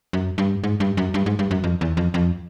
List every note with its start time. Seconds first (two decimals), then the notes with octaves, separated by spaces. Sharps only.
0.13 F#2
0.38 G2
0.64 G#2
0.80 G2
0.97 F#2
1.14 G2
1.26 G#2
1.39 G2
1.51 F#2
1.64 F2
1.81 E2
1.97 F2
2.14 F2